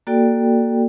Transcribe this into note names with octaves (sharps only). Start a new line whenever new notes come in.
A#3 F#4 A4 D5 G5